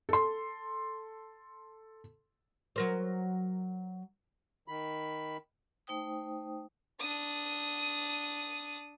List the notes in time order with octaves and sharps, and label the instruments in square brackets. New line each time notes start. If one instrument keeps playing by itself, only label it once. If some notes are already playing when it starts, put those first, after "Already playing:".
[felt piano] A4 C6
[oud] F#3 A#4 C5
[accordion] D#3 B5
[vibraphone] A3 D#4 C5 G5 D#6
[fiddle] D4 D#6